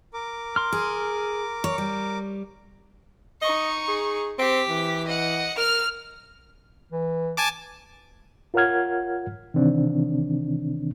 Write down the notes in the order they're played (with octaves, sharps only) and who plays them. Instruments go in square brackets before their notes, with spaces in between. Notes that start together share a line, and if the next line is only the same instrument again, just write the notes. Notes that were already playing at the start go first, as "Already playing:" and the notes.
[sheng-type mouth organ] A#4 D6
[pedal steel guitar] C6 F6
[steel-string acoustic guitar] G#4
C#5
G3
[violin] D#4 C#6 [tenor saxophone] D#5
[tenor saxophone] G#4
[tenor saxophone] C4 [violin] G4 B6
[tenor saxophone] E3
[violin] D#5 F#5
[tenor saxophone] A#4 [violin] F6 F7
[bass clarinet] E3
[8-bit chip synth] G#5 A5 D6
[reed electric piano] F4 A#4 C#5 F#5 F6 G#6
C3 D#3 E3 C4 D4